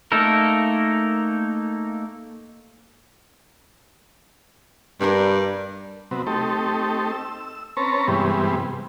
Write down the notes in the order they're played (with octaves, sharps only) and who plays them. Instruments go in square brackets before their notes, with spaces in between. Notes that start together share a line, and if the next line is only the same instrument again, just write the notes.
[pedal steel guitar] A3 A#3 D#4 A4 A#4
[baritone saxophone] G2 [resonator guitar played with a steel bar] G3 D4 A#4
[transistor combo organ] C3 F#3 B3
A3 C4 D#4 G4 A4
E6
C4 C#4 B4 C#5 A5 A#5
G2 C3 E3 G3 G#3 B3